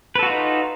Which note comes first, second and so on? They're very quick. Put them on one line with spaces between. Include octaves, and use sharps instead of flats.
B4 A4 F#4 F4 D#4